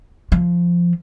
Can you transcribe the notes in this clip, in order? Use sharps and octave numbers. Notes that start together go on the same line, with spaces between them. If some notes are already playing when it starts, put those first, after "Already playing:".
F3